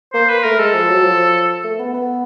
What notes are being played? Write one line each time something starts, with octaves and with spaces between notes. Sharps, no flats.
A#3 C5
B4
A3 A#4
G#3 A4
F3
F#3
F3
A3
B3
B3